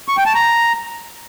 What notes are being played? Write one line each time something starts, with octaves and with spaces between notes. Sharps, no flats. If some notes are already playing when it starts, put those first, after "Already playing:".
C#6
G5
A5
A#5